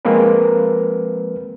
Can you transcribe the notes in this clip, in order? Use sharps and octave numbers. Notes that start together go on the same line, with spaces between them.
F3 G#3 A#3 C4 A#4 B4